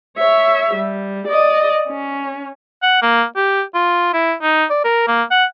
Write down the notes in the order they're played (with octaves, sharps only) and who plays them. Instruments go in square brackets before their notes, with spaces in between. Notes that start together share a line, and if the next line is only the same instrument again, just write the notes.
[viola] C#5 E5
G3
D5 D#5
C#4
[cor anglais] F#5
A#3
G4
F4
E4
D#4
D5
A#4
A#3
F#5